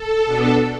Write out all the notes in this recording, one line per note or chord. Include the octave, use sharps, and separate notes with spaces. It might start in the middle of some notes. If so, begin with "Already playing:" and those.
Already playing: A4
B2 B3 D4